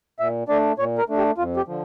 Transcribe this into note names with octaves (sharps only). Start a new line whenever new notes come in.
A#2 E5
A3 D4 D5
A#2 C#5
A#4
A3 D4
G4
F2 F4
G4
D3 F3